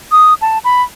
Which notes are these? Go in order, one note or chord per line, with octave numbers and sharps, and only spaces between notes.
D#6
A5
B5